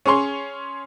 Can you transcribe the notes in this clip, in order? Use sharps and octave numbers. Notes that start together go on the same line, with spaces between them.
C#4 G#4 C#5 C6